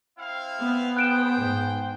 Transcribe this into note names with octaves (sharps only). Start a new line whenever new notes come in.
C4 E4 F5
B3
G#4 C5 G5 F#6 D7 E7
G#2